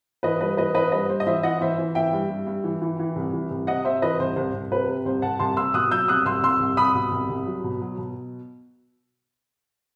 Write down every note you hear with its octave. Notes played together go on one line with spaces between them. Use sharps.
E3 B4 D#5
G2 B4 D#5
E3 B4 D#5
E3 B4 D#5
G2 B4 D#5
G2 C5
D#5
E3 C5 E5
E3 D#5 F#5
E3 C5 E5
E3
E3 E5 G5
G2
G2
G2
E3
E3
E3
C2
E3
C2
C3 D#5 F#5
C3 C5 E5
E3 B4 D#5
C2 C5
C2 C5
C2
C3 B4
C3
C2 C5
C2 F#5 A5
C2 A5 C6
C3 C6 E6
B2 D#6 F#6
F#3 E6 G6
C2 D#6 F#6
C2 C6 E6
C2 C6 E6
C2
C2 B5 D#6
B2
C2
C2
F#3
B2
F#3
B2